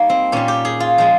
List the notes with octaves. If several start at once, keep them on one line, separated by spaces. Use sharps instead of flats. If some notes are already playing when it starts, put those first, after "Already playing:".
Already playing: G3 A#3 D#4
C4
A#2 G3 C#4
G4
G#4
F4
F3 G#3